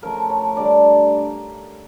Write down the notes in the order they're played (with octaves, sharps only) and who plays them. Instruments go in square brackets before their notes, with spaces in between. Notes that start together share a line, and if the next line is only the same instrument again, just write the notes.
[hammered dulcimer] C#3 F3 A3 A#4
C#5
D3 G3 D4 D5